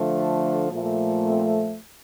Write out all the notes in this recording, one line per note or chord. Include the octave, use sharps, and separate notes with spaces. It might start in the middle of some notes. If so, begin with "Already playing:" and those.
Already playing: D3 F3 A3
A#2 F3 A3
C4